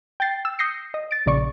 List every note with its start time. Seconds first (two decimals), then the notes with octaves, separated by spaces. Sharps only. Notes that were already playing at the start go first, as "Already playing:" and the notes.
0.20 G5 G6 A6 C7
0.45 E6
0.59 D#6 G6 A#6 C7 C#7
0.94 D#5
1.11 A6 D7
1.26 A#1 C#3 D5 C#6